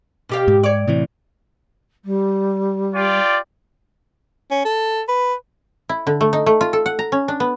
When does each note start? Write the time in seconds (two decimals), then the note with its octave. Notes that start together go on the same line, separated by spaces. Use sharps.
0.29 B2 G4 F5
0.48 G#2
0.63 C#5 D5
0.87 A2 C3 E3
2.05 G3
2.94 F4 G4 D5
4.51 C#4
4.65 A4
5.08 B4
5.89 E4
6.07 D3
6.21 A3
6.33 D#4
6.46 A3
6.61 F4
6.73 A4
6.86 F#5
6.99 A#5
7.12 C#4
7.28 D4
7.40 B3